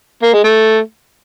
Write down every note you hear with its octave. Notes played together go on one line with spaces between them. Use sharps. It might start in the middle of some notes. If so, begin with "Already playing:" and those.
A#3
G#3
A3